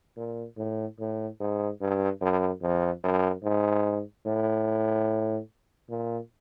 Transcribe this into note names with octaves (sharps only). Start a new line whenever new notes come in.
A#2
A2
A2
G#2
G2
F#2
F2
F#2
G#2
A2
A#2